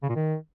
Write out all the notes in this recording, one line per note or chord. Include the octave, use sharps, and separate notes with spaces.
C#3
A#2
D#3